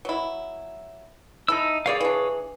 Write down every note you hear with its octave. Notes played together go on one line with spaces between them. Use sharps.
F#3 E4
D#4 E4 A4 E6
G3 A#3 G#4 C#5 D5 F5
E3 D4